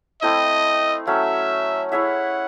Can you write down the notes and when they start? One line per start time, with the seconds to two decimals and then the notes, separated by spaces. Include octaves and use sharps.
0.22 A3 C4 E4 D#5
1.07 F#3 A3 C#4 E5
1.92 E4 G#4 C#5 E5 F#5